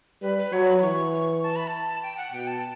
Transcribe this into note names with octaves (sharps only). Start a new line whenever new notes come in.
G3 B4
B4
F#3 C#5
B5
B5
E3 C#6
C#6
A5
B5
A5
G5
F#5
B2 G5
A5